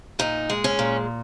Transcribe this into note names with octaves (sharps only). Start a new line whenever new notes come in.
A#2 D#4
G#3
C#4
A#2